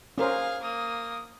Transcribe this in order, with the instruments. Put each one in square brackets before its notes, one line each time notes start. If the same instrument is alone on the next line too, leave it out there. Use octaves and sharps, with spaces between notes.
[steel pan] C#4 A#4 C5 [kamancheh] G#4 F5
[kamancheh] A#3 D#6